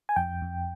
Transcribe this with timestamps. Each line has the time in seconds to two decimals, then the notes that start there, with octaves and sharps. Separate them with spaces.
0.09 G#5
0.16 F2 G5
0.42 F2